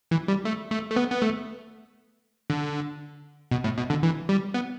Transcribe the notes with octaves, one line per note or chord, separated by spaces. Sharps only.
E3
G3
A3
A3
A3
B3
B3
A3
D3
B2
A2
B2
D3
E3
G3
B3